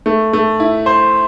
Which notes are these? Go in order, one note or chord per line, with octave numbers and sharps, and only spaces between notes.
A3
A3
E4
C5